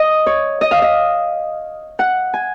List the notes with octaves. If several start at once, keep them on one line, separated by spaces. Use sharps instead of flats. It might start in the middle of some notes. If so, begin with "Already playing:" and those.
Already playing: D#5
C#5
D#5
F5
D#5
F#5
G#5